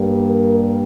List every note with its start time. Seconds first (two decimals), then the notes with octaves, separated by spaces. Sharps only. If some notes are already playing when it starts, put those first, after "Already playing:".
Already playing: G2 G3 A#3
0.24 A#4